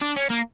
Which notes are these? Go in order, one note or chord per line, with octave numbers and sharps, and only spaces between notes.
D4
C#4
A#3